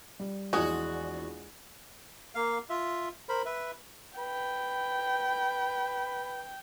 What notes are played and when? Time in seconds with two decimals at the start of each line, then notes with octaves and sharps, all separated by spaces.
0.20 G3
0.53 A#1 E2 G#3 F#4
2.35 A#3 F5
2.70 F4 E5
3.29 A#4 C5 B5
3.46 B4 E5
4.18 B4 G5